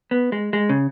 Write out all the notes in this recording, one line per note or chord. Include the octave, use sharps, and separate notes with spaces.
B3
G#3
G#3
C#3